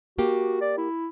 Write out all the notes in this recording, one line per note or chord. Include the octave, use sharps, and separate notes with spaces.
A#3 F#4 G4
D5
E4